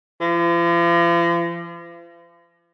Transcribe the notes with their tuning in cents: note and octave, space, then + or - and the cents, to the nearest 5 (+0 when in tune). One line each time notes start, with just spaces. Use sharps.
F3 -40